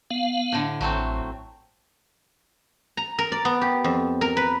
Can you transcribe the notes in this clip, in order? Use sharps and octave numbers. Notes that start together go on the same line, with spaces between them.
B3 F5
A2 D3
A1 F#3 A3 C4
A#5
A#4
D5
B3
G4
F2
A#4
B4